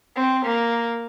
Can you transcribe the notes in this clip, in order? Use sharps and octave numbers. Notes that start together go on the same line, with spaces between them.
C4
A#3